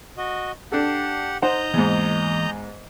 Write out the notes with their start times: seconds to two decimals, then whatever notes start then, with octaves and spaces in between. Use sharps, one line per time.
0.17 F#4 D#5
0.72 D4 G4 A4 F#5
1.42 D#4 C5 D#5 F#5 A#5 G6
1.74 E2 G#2 E3 A#3